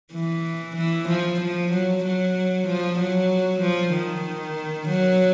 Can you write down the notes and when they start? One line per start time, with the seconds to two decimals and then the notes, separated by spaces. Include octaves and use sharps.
0.14 E3
0.77 E3
1.09 F3
1.41 F3
1.72 F#3
2.05 F#3
2.68 F3
2.99 F#3
3.62 F3
3.93 D#3
4.89 F#3